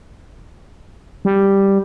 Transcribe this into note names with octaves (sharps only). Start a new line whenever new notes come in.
G3